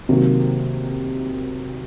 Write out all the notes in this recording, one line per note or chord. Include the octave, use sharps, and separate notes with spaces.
C3 D#3 F#3 A#3